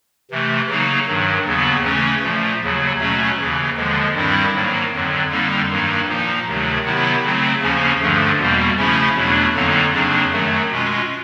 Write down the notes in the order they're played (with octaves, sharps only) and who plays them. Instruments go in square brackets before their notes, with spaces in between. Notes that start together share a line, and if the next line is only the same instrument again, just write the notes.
[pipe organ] C3 E3 A3
C#3 F#3 A#3 D#4
G2 D#3 F#3
D#2 C#3 F#3 B3
C#3 E3 A3 C#4
A#2 F3 A3
D#2 C#3 F#3
B2 F#3 A3 C#4
D#2 C#3 E3
D#2 D3 F3 G#3
G2 D#3 G3 C4 E4
G#2 D#3 F#3 A#3
F2 D3 F#3
F2 D3 G3 A#3 D#4
G2 D#3 F#3 A#3 D#4
A#2 F3 A#3 D#4
D2 C3 D#3 F#3 A3
C3 D#3 F#3 B3 E4
C#3 F#3 A3 C4
D#2 C#3 F3 A#3 C#4
G2 D3 F3 A3
E2 B2 G3 A#3
C#3 F3 A3 C#4 E4
E2 B2 F#3 A3 D4
F2 D3 F#3 A#3 D#4
F2 C#3 F#3 A#3 D4
F#2 D#3 F#3 A3
B2 G#3 C#4 F4